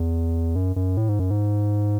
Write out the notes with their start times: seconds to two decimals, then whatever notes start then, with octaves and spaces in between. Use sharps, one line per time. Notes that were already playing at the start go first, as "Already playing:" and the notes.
Already playing: E2
0.56 F#2
0.76 F#2
0.97 A2
1.09 G#2
1.19 F#2
1.31 G#2